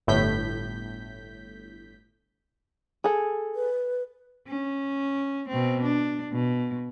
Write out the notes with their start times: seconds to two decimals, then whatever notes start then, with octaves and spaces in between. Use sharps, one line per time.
0.07 G1 A2 G6 B6
3.04 G#4 A4
3.55 B4
4.47 C#4
5.49 B2 C4
5.83 D4
6.32 B2